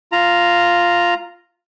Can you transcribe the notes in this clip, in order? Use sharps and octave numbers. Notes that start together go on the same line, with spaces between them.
F4 A#5